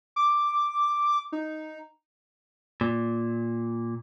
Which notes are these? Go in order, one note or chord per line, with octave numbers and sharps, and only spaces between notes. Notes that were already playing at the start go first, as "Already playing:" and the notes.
D6
D#4
A#2